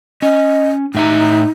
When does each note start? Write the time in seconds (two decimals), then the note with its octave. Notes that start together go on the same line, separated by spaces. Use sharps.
0.22 C#4 D#5
0.95 A2 D#4 E5 A#5